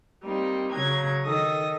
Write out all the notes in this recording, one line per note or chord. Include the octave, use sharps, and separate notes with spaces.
G3 A#3 C4 D#4
C#3 F#3 A#5 G#6
D#3 A4 D#6 A#6